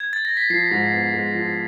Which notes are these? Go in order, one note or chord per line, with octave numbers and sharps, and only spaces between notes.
G#6
A6
A#6
B6
F3 C7
G#2
B3
G#3
F3